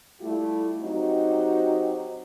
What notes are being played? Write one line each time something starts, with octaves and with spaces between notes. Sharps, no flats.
G3 A3 E4 F4 G4
F#3 C4 D#4 F#4 G4